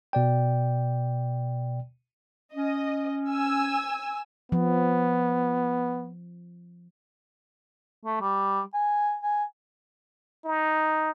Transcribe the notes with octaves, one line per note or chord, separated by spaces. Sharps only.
B2 D5 G5
C#4 D#5
G#5 E6
F3 B3
A3
G3
G#5
G#5
D#4